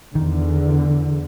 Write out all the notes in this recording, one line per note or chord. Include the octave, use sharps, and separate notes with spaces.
E2 D3 D#3